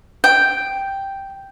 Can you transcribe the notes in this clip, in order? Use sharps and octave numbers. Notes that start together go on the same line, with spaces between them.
G5